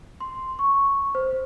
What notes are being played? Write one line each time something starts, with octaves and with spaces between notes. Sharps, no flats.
C6
C#6
C5